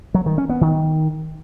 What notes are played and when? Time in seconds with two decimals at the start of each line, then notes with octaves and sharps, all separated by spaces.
0.14 F#3
0.26 D#3
0.38 C#4
0.49 B3
0.61 D#3